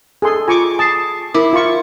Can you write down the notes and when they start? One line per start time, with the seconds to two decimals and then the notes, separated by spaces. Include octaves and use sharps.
0.22 G#4 A4 C6
0.48 F4 G#5 C#6 D6
0.79 A5 D#6 C7
1.34 E4 A#4 D6
1.53 F4 C#6